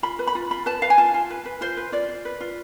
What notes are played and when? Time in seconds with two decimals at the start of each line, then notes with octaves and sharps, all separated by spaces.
0.03 F4 B5
0.19 B4
0.27 B5
0.35 F4
0.51 F4 B5
0.66 B4 A5
0.82 B4 F5
0.90 G#5
0.98 F4 A5
1.14 F4
1.30 B4
1.46 B4
1.61 F4 C5
1.77 B4
1.92 F4 D5
2.09 F4
2.25 B4
2.40 F4